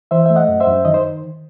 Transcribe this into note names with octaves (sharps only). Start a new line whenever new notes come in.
E3 C5 E5
A3 E5
D#5 F#5
F#2
C5 E5
F#2
D#3 D#5
C5